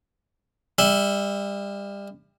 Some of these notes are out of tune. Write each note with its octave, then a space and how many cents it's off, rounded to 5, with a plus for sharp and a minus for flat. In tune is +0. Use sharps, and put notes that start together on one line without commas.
G3 +30 E5 +0